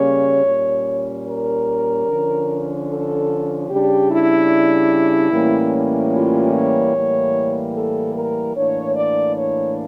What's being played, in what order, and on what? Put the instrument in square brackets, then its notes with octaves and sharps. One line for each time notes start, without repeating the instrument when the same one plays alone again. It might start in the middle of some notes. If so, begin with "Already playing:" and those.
Already playing: [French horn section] C#3 G3 A#3 C#4 C#5
A#2 G3 C#4
A#4
D3 F3 C#4
A4
C#3 G3 D4 G4
E4
A2 E3 G3 A#3 C#4
F4
C#5
A2 E3 G3 A#3
A4
A#4
A2 E3 A#3 D4 C#5
D5
C#5